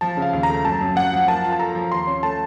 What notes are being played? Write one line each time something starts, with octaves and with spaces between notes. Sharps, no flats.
F3 A5
C#3
F5
D#2
A#5
A3
F#2 A5
F#2
F#2 F#5
F3
A#3 A5
F4
A5
A4 A#5
F3
D#2 C6
C#4
A3 A5